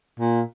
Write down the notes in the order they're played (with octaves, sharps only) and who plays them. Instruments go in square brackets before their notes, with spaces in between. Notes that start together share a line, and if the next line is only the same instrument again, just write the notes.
[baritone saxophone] A#2